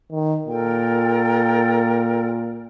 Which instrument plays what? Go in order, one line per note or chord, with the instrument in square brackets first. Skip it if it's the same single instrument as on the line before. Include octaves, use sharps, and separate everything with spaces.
[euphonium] D#3
[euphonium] A#2 [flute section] A4 A#4 G5